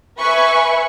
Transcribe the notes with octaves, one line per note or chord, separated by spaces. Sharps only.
B4 E5 G#5 B5 C#6